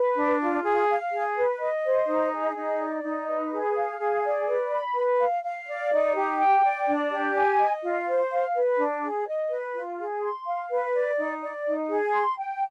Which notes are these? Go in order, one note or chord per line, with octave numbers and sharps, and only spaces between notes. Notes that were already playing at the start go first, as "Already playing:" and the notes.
Already playing: B4
D4
F4
G#4
F5
G#4
B4
D#5
C5
D#4
G#4
D#4
D5
D#4
B4
G#4
F5
G#4
D5
B4
B5
B4
F5
F5
D5
D#4
G4
G5
D5
D4
G4
G#5
D#5
F4
C5
F5
B4
D4
G#4
D#5
B4
F4
G#4
C6
F5
B4
D5
D#4
D5
D#4
G#4
C6
G5